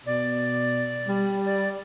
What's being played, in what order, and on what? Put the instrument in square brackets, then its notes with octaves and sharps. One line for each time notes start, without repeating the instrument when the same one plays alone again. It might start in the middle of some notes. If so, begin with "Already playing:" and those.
[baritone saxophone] B2 [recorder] D5
[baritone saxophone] G3
[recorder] D5